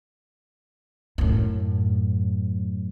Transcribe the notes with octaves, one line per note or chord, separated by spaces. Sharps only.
F#2 A2